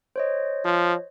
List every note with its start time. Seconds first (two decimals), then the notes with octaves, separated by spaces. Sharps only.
0.16 C5 C#5 D#5
0.65 F3